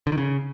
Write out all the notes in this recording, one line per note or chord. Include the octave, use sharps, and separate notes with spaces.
D3
D#3
C#3